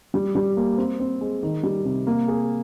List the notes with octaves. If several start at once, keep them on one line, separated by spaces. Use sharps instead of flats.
G3
G3
A#3
C4
C4
G#3
D#3
G3
C3
A#3
G#4